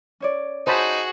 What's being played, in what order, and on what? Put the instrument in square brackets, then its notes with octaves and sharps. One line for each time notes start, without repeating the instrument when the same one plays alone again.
[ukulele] C#4 C#5 D5
[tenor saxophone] D#4 [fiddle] F#4 G#4 [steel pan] C5 A5 B5